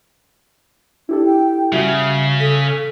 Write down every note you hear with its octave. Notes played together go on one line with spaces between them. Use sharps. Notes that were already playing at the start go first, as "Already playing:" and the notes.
D4 E4 G4 A4
G5
C#3 G3 F#4 E5
A4 B6 D#7